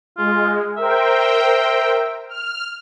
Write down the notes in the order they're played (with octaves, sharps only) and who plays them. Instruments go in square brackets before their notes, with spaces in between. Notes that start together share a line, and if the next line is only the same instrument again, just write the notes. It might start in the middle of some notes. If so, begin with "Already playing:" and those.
[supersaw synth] G#3 [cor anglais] F4
[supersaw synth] A#4 C5 G5 [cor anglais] E5
[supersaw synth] F6